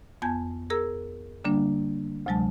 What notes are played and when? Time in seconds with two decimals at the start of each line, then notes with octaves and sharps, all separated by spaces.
0.22 F2 B3 G#5 A5 G6 G#6
0.70 G#4 A#4 A#5 E6
1.44 D3 G3 A#3 D4
2.26 D2 C3 F#3 G#3 A5